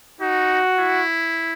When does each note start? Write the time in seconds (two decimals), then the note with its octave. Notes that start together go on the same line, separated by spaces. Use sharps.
0.21 D#4 F#4
0.79 E4